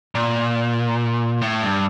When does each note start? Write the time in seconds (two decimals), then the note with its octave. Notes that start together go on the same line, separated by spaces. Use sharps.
0.15 A#2
1.42 A2
1.63 G2